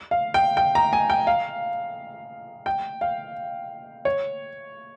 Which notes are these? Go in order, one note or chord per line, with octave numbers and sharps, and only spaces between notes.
F5
G5
G5
A#5
G#5
G5
F5
G5
F5
C#5